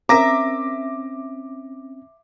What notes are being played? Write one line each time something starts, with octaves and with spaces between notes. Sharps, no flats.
C4 C#4 A#4 E5 A#5 D6 A#6